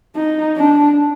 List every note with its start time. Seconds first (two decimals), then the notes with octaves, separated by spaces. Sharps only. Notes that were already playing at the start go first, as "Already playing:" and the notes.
0.15 D#4
0.57 D4